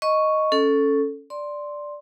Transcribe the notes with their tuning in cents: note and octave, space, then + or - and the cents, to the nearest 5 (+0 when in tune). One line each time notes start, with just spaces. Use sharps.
D#5 +0 C#6 +0
C#4 +0 A4 +0
D5 +0 C6 +5